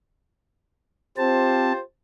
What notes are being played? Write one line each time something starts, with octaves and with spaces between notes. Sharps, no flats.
C4 F4 G4 C5 A5